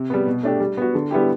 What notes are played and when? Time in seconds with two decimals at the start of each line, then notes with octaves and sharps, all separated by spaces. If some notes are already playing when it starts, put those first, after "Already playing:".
Already playing: C3
0.10 G3 B3
0.27 B2
0.43 A3 D4 G4
0.60 G3
0.77 B3 F#4
0.95 D3
1.11 G3 B3 E4 G4